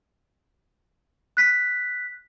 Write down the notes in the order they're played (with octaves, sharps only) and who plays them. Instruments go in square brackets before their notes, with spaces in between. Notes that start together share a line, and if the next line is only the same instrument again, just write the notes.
[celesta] F#6 B6